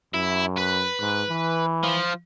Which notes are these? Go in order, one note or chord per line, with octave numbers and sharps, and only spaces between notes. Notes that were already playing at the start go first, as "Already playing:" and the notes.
F#2 E4
B4
G#2
E3
F3